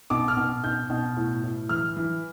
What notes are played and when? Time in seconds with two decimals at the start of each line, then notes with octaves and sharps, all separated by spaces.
0.10 B2 D6
0.28 F6
0.37 B2
0.64 B2 G6
0.90 B2
1.17 A2
1.43 A2
1.69 E3 F6
1.97 E3